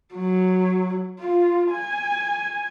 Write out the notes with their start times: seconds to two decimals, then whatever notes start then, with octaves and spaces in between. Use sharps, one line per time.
0.15 F#3
1.20 F4
1.72 G#5